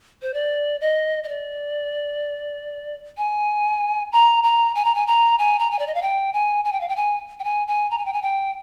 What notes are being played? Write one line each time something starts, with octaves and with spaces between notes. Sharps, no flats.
C5
D5
D#5
D#5
D5
G#5
A#5
A#5
G#5
A#5
G#5
A#5
G#5
A#5
G#5
D5
D#5
F5
G5
G#5
G#5
G5
F5
G5
G#5
G5
G#5
G#5
A#5
G#5
G5
G#5
G5